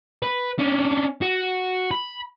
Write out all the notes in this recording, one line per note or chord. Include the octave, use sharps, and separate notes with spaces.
B4
C#4 D4
F#4
B5